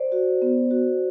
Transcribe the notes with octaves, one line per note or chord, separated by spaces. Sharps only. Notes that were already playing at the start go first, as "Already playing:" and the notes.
Already playing: C5 D5
F#4
B3
F#4